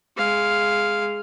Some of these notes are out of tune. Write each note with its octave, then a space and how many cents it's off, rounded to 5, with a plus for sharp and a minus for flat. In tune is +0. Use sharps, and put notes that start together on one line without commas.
G#3 +0 F5 +0